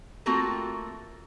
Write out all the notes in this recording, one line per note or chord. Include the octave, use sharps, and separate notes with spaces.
A3 A#3 C4 F4 F#4 A4